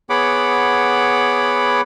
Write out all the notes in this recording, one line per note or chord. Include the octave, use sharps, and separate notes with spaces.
B3 G#4 C#5 F#5 B5 D6